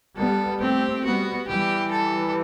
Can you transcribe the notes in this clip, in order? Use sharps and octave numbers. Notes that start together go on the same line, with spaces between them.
G3 B3 A4
A3 C4 G4
G3 B3 F#4
E3 G3 G4
A4